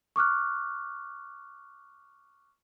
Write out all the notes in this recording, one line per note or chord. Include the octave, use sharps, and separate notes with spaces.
C#6 D6 F6 F#6